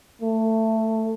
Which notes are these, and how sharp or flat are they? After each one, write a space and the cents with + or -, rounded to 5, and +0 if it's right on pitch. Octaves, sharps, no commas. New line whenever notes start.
A3 +15